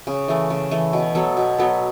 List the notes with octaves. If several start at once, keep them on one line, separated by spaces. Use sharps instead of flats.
C#3
E3 A3
C#3
E3 A3
B2
F#3 B3 A4
B2
F#3 B3 A4